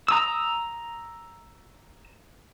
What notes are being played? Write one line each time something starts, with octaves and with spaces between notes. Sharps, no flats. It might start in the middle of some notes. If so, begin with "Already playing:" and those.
A#5 D#6 E6